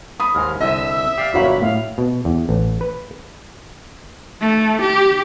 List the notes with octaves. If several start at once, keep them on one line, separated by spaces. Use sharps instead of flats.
B5 D#6
D#2 G#2 G#3 F6
C2 D3 D#5 E5 E6
G4 D5 F5 C7
G1 F#2 A#2 F#4 C#5 F5 B5
A2 F5
B2
E2
A1
B4
A3
G4